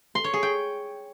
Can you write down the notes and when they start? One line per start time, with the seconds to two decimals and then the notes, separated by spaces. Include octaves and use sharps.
0.15 C6
0.24 C#5
0.34 G#4
0.43 G5